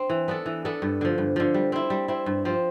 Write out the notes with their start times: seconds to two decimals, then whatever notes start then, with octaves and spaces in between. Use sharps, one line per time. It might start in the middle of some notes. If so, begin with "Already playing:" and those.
Already playing: C4 D4
0.10 E3
0.28 B3 D4 A4
0.46 E3
0.65 B3 D4 A4
0.82 G2
1.01 D3 F3
1.18 G2
1.36 D3 F3
1.54 G3
1.72 C4 E4
1.90 G3
2.08 C4 E4
2.26 G2
2.45 F3 C4